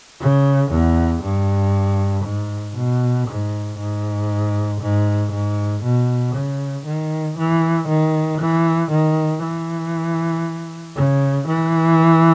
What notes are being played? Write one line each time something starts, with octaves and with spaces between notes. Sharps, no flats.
C#3
E2
G2
G#2
B2
G#2
G#2
G#2
G#2
B2
C#3
D#3
E3
D#3
E3
D#3
E3
C#3
E3